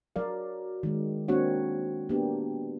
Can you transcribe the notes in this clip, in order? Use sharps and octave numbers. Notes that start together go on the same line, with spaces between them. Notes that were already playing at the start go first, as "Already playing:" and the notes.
F#3 A#4 D5 F5
D#3 G#3
A#3 C4 D4 F#4 C#5 F#5
A#3 B3 D4 G4